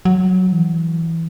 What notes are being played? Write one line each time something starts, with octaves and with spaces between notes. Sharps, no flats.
F#3
E3